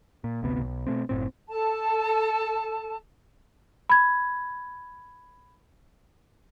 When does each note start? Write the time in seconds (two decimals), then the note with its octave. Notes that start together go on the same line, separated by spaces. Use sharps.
0.24 A#2
0.42 G#1 D2 C3 B3
0.60 B1
0.86 B2 A3 C4
1.09 F#1 A2 C4
1.50 A4 A5
3.90 B5 G#6